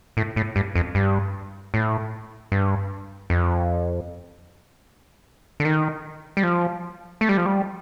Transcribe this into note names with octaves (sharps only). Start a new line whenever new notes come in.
A2
A2
G2
F2
G2
A2
G2
F2
D3
D#3
G3
F3
A3
G3
F3
G3